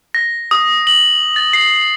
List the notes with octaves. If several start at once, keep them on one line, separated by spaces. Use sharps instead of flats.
A#6
D#6
F#7
A6
C7